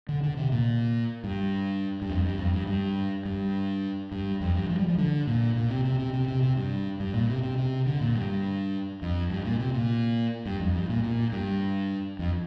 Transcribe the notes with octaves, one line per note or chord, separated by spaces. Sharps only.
D3
D3
C3
A#2
G2
G2
F2
G2
F2
G2
G2
G2
G2
F2
G2
F3
G3
F3
D3
A#2
A#2
C3
C3
C3
C3
C3
C3
G2
G2
A#2
C3
C3
C3
D3
A#2
G2
F2
G2
A#2
C3
A#2
G2
F2
G2
A#2
A#2
G2
F2